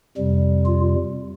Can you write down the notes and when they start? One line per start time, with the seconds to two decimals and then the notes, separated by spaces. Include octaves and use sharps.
0.17 F2 C3 G3
0.66 F4